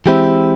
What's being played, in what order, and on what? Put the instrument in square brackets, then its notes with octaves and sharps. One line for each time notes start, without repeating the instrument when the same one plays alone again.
[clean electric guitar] E3 G#3 C4 E4 G4